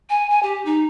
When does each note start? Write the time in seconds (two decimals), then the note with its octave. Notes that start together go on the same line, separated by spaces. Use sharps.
0.09 G#5
0.30 G#5
0.43 G4
0.65 D#4